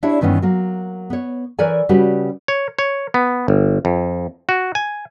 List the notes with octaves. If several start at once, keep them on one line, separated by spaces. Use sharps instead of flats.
D4 E4 G4 C#5 D5 E5
G2 D#3 E3 B3 C#4
F#3 A#3
B3 C#5
E3 A#4 B4 C#5 D5 G#5
C#3 G3 F#4 G4 B4
C#5
C#5
B3
G1
F2
F#4
G#5